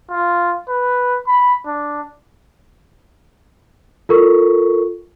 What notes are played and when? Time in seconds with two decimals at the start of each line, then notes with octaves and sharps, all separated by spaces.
0.11 F4
0.69 B4
1.27 B5
1.66 D4
4.09 F4 A4 A#4 C#6